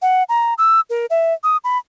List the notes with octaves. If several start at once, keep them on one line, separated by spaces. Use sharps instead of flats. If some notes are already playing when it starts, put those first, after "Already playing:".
F#5
A#5
E6
A#4
E5
D#6
B5